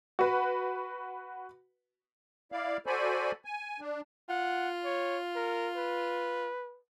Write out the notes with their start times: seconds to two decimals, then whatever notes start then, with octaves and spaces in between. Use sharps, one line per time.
0.19 F#4 B4
2.52 E4 D5 F5
2.86 F#4 A4 C5 D5 G#5 B5
3.45 G#5
3.80 D4
4.29 F4 F#5
4.85 C#5
5.36 A#4
5.77 B4